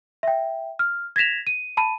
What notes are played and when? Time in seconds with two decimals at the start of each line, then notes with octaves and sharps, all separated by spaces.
0.23 E5 G5
0.79 F6
1.16 G#6 A#6 B6 E7 F7
1.47 D#7
1.77 A5 B5 D#7